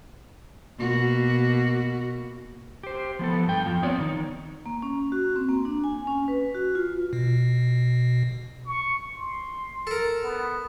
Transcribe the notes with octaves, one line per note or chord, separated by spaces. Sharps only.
B2 A#3 F#4
G4 C5
F3 B3 A4
G2 G5
F2 F3
B3 C4 C#5 D5
D#3 D#4
A#3
C#4
F#4
C4
A#3
D4
G#5
C#4
B4
F#4
F4
B2
C#6
C6
A4 A#4
B3